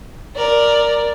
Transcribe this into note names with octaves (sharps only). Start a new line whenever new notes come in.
A#4 D5